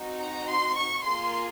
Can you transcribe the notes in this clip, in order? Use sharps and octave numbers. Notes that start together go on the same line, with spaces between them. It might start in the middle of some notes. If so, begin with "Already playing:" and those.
Already playing: C4 D#4 F#4
A#5
C6
C#6
A#3 F4 G#4 C6